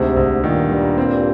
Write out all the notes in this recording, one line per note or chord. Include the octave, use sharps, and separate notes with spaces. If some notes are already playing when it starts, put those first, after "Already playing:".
Already playing: D2 G#2 C3
D2
G2 A#2 D#3
G3
C4